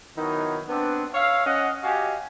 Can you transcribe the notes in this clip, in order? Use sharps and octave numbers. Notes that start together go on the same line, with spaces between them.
D#3 F#3 B3 D#4 E4
B3 C4 D4
C#5 E5 F5
C#4 D#5 F#5
F#4 G4 D#5 F5 G#5